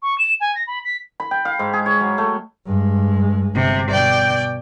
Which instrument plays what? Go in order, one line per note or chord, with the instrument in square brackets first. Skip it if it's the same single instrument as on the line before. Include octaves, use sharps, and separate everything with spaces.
[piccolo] C#6
E7
G#5
A#6
B5
B6
[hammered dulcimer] B5
G5
F5
G#2
G#4
C#5
F#3
A3
[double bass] G2 G#3
[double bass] G1 [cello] C3
[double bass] B2 [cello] D5 G5